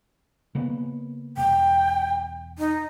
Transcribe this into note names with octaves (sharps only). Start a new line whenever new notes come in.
C#3 A#3 B3
E1 G5
D#4